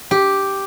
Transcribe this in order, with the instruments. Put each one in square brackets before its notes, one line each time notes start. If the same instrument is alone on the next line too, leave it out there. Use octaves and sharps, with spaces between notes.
[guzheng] G4